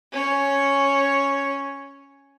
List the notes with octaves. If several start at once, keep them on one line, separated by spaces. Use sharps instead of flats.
C#4 C#5